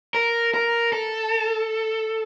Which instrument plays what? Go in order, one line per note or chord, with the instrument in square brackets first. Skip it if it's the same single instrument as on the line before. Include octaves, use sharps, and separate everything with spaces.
[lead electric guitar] A#4
A#4
A4